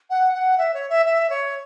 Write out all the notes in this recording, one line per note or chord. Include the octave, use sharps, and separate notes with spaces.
F#5
F#5
E5
C#5
E5
E5
C#5